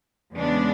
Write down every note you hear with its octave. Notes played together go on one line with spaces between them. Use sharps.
E2 C#3 G#3 B3 D4